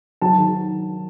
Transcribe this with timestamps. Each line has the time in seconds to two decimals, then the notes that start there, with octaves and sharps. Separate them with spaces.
0.22 F#3 A5
0.38 D#3